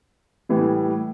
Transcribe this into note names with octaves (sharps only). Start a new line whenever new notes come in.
A2 E3 G3